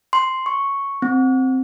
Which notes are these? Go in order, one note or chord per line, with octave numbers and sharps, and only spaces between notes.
C6
C#6
C4